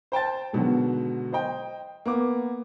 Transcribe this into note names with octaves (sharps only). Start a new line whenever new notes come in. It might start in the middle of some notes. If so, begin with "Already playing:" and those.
C5 G5 A5 A6
G#2 B2 D3 D#3 F#3
C5 D#5 G5
A#3 B3 D6